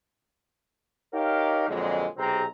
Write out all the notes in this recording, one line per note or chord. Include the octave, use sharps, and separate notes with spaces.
D#4 G4 A#4 C#5 F5
F2 A#2 D3 F#3 G#3
B1 C3 C4 G4 G#4 A#5